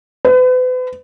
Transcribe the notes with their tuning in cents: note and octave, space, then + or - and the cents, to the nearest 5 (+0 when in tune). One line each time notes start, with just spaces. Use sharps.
B4 +40